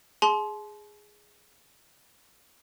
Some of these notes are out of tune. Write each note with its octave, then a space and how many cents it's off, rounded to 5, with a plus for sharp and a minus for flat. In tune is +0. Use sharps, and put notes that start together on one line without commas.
G#4 +0 A5 -45 C6 +0